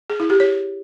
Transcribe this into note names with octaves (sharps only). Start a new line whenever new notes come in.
G#4
E4
G4
C#5